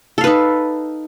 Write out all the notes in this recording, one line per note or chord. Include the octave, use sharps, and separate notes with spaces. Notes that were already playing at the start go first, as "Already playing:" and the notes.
D#4 A4 B4 F5